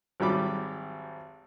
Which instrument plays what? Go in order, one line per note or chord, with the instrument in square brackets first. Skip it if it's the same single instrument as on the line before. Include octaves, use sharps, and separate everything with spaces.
[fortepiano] G#1 F#3 G3 B5 D6